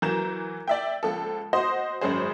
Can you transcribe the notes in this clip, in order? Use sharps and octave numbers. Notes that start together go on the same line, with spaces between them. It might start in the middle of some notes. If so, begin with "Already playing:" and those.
E3 F#3 A#4 A#5 G6 E7
D5 E5 G5
C#2 F3 A4
F#4 C5 D#5 C6 D#6
G#1 F#2 G#3 C#4 G#4 C5